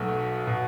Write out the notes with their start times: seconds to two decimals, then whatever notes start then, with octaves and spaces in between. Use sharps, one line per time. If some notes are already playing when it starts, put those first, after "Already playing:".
Already playing: B1 B2 F#3 A3
0.47 B2